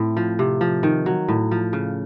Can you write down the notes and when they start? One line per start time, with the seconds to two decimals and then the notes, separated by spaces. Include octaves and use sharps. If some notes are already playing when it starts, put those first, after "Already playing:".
Already playing: A2 A3 C4
0.17 F3
0.39 C3
0.61 F3
0.83 D#3
1.06 F#3
1.29 A2
1.51 F3
1.73 C#3